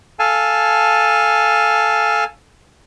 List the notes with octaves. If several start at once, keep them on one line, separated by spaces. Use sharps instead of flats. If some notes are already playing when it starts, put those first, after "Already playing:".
A4 F5 G#5 A5